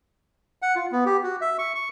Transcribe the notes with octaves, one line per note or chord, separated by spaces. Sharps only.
F#5
F4
B3
G4
F#4
E5
C#6
C#6